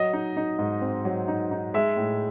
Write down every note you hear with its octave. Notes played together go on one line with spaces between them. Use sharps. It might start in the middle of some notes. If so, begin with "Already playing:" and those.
Already playing: F#3 D#5
D#4
D#4
G#2
C4
F#3
D#4
D#4
G#3 E5
A2